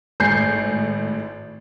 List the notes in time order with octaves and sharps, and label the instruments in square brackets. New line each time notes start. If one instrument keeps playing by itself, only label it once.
[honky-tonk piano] G#1 A2 G#5 G6 C7 C#7